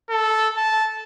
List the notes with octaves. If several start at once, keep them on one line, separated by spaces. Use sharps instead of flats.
A4
A5